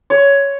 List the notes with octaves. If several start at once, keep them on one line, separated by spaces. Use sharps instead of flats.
C#5